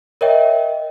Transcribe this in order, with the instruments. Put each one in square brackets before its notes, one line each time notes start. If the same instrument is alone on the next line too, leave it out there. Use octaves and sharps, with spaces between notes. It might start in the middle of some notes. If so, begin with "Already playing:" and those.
[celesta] A#4 C#5 D#5 E5 G5